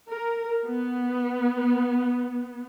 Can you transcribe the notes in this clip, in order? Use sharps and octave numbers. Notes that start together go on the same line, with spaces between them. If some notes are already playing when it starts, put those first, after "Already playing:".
A#4
B3